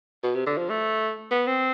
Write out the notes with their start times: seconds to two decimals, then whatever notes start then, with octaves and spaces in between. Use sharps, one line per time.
0.23 B2
0.35 C3
0.46 D3
0.58 F3
0.70 A3
1.31 B3
1.47 C4